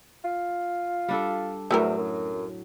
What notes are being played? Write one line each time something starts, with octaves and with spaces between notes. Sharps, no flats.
F4
G3 D4 A4
E2 A2 F#3 A3 E4 A#4
F#2